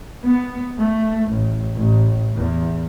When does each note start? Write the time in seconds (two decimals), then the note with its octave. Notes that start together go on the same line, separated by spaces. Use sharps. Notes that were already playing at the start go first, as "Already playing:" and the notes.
0.23 B3
0.78 A3
1.29 A1
1.75 A1
2.36 E2